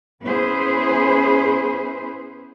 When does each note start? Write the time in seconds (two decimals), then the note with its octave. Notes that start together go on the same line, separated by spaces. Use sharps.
0.24 B3 C#4 E4 G#4 B4 C5